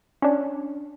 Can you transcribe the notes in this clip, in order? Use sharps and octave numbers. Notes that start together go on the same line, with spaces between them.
C#4 D4